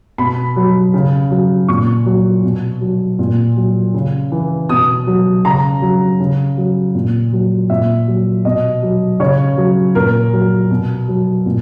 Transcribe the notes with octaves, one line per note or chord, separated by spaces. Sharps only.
B2 B5
F#3
C#3
F#3
A#2 C#6
F#3
B2
F#3
A#2
F#3
C#3
E3
B2 D#6
F#3
C#3 A#5
F#3
C#3
F#3
A#2
F#3
A#2 E5
F#3
B2 D#5
F#3
C#3 C#5
F#3
A#2 A#4
F#3
B2
F#3
A#2